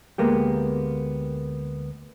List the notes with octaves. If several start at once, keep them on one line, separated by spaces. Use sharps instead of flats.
D2 G#3 A#3 B3 G4